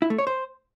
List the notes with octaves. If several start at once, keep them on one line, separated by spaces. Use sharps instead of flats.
E4
A3
C#5
C5